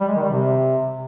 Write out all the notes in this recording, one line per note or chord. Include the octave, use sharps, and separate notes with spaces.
G3
G#3
D#3
G3
C3